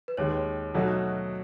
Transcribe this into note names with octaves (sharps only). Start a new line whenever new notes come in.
B4
D#2 D#3 G#3 C#5
B2 F#3 A3 D#4 F#4